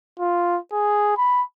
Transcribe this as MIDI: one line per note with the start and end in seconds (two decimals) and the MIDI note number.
0.20 0.57 65
0.73 1.17 68
1.17 1.42 83